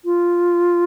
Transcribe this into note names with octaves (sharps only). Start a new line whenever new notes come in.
F4